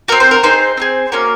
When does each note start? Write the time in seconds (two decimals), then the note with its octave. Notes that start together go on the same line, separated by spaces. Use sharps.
0.08 C4 F#4 A#4
0.20 C5
0.31 A#4
0.43 C4 D#4 G#4 C5
0.77 C4 D#4 G#4
1.12 A#3 C#4 F#4 A#4